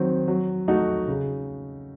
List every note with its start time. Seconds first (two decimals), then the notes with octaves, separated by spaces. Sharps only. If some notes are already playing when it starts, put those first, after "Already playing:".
Already playing: D#3 F#3 C4
0.28 F#3
0.68 A3 D#4 F#4
1.08 C#3